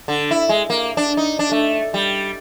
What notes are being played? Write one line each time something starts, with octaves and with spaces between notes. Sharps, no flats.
D3
E4
G#3
A#3
D4
D#4
D4
A3
G3